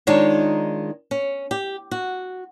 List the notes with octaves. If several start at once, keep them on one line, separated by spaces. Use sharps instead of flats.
D#3 G#3 D4 D#4 F4 C#5
C#4
G4
F#4